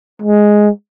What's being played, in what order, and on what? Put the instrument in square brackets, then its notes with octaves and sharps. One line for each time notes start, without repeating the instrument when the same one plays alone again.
[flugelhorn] G#3